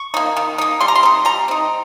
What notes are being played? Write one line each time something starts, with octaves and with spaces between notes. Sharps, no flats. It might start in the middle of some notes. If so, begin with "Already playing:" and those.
Already playing: C#6
A#3 D#4
D#3
A#3 D#4
G3 C6
A#5
C6
C4 D#4
G3 A#5
C4 D#4